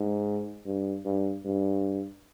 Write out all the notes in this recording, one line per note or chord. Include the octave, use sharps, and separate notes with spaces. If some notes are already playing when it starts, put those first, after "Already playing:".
Already playing: G#2
G2
G2
G2